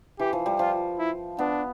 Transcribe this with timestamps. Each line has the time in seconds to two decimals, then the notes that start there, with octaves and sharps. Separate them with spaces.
0.19 E3 G4
0.33 F3
0.46 G3
0.59 F3 F4
0.99 E4
1.39 B3 D4